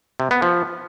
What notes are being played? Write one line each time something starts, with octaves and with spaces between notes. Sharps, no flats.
C3
B3
F3